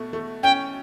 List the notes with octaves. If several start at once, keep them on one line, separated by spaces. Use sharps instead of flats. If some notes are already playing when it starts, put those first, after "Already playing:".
Already playing: B2 A3
A3
C#4 G5